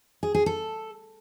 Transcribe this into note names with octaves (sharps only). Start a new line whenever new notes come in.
G#4
G#4
A4